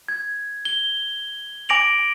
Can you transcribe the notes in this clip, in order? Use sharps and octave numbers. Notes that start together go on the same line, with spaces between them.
G#6
G7
G#5 D6 A#6 D7 F7 F#7